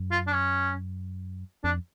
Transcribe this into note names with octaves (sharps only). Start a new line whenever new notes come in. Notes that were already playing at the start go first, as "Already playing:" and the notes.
Already playing: F#2
F4
D4
C#4
F2 D4